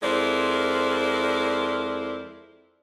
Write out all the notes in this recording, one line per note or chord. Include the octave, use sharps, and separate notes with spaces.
F2 G#3 E4 A#4 C5 D5